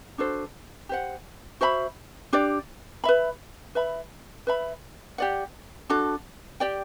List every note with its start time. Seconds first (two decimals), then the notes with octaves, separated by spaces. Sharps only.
0.18 D4 F#4 A4 C5
0.89 G4 C5 F#5
1.61 F#4 C5 E5 B5
2.33 D4 G4 D5
3.04 B4 E5 B5
3.75 B4 E5 B5
4.47 B4 E5 B5
5.18 G4 D5 F#5
5.89 D4 F#4 A4
6.60 G4 D5 G5